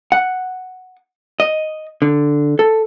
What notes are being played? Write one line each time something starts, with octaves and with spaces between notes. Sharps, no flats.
F#5
D#5
D3
A4